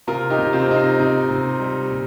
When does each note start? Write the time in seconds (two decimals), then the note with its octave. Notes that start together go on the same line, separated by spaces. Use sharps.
0.07 C3 F4 A#4
0.30 D#4 G4
0.38 C3
0.53 C4 F4
0.68 C3 D#4
0.76 C4
0.99 C3 D#4
1.29 C3
1.59 G3
1.90 A#2